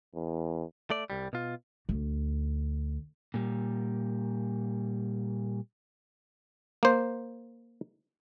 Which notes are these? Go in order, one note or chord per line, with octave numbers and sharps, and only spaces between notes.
E2
A3 D5
C2 G3
B2 F4
D2
A#2 G3
A#3 C5